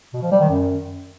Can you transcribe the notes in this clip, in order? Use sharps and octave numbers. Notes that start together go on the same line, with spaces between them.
B2
F3
G3
D#3
F#2